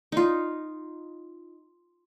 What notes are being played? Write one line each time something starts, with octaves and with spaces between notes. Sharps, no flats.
D#4 F4